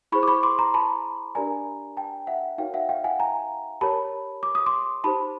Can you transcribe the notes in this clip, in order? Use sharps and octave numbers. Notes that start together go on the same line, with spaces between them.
E4 G#4 C5 B5 C#6
D6
B5 C#6
C6 D6
A#5 C6
A5 B5
D4 G4 A#4 D5 G#5 A#5
G5 A5
E5 F#5
D#4 F#4 A#4 C#5 F5 G5
E5 F#5
F5 G5
F#5 G#5
G#5 A#5
G4 A#4 C#5 A5 B5
D6
D#6
C6 D6
D#4 G4 C5 A5 B5